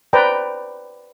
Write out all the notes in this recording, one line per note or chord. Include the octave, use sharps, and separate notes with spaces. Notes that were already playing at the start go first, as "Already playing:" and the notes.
B4 C5 D5 G5 A#5